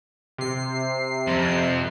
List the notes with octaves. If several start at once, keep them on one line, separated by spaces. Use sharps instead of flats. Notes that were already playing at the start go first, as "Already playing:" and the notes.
C3 C7
F2